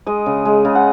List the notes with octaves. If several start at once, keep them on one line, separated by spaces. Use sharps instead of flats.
G#3 D#5
C#3
G#3
C#3
F#5